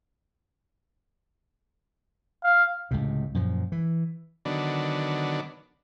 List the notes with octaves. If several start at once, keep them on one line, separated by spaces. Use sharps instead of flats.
F5
C#2 A2 C3
F#2 A#2 F3
E3
D3 D#3 F#3 B3 D4